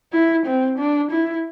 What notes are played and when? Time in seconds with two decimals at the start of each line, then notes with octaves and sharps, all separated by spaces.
0.13 E4
0.46 C4
0.78 D4
1.11 E4